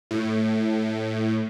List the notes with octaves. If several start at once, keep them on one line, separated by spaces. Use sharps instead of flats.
A2